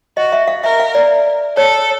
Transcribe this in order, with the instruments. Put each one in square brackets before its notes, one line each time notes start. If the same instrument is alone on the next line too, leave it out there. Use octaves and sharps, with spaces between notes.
[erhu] F#4 [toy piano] D#5
[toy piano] E5
F5
[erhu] A#4 [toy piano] E5
[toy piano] F5
D5
[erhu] A4 [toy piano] C#5